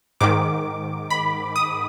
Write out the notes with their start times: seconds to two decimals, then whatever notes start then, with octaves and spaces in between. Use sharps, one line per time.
0.21 G#2 D#3 D6
1.10 B5
1.56 D#6